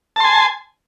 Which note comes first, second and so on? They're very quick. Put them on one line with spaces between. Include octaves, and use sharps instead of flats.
A5 C6 G#5